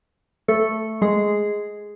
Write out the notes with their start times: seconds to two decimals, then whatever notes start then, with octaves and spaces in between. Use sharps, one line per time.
0.48 A3 A4
1.02 G#3 G#4